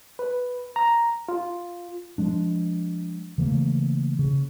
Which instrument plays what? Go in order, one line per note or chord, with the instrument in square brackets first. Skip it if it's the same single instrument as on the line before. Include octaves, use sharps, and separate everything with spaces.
[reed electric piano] B4
A#5
F4
[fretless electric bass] F3 G#3 D4
C#3 E3 A3 A#3
C#3